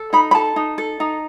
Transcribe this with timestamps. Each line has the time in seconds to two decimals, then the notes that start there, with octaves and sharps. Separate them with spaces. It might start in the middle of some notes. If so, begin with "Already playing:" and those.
Already playing: A4
0.13 D#4 B5
0.31 B5
0.35 A4 A5
0.56 D#4
0.78 A4
1.00 D#4